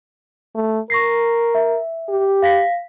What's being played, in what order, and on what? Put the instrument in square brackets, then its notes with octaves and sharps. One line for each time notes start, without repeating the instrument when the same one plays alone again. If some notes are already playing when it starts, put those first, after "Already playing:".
[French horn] A3
[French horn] A#4 [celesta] C#6 A#6 C7
[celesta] E5
[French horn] G4
[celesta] F5 A#6 B6